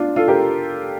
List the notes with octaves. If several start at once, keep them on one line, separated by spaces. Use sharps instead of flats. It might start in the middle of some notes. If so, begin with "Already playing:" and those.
Already playing: D4 F4
F4 A4
G4 A#4